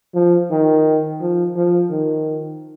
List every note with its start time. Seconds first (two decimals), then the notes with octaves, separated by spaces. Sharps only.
0.15 F3
0.51 D#3
1.21 F3
1.56 F3
1.91 D#3